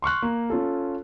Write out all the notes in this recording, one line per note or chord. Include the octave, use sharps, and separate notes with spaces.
C6 C#6 F6 F#6
A#3
C#4 F4 A4